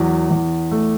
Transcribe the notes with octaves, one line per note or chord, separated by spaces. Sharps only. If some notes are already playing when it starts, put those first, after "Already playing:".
Already playing: E2 F#3
E2
A3